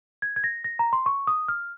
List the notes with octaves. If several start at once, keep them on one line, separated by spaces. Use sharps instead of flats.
G#6
G#6
A#6
A#6
A#5
C6
C#6
D#6
F6